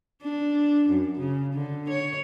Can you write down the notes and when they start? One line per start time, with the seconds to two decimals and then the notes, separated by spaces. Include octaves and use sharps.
0.23 D4
0.89 F#2
1.19 C#3
1.53 D3
1.89 C#5